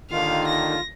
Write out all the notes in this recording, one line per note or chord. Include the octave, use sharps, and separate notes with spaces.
D#2 D3 D#3 F4 F5
A#6